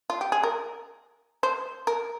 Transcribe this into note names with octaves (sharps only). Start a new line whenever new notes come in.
F4
G4
G#4
A#4
C5
A#4